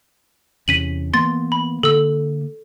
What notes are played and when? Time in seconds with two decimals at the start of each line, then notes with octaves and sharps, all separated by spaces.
0.68 E2 C3 C#4 B6 D#7 F#7
1.14 E3 A#3 B3 C6 A6
1.52 B5
1.83 D3 A#3 A4 E6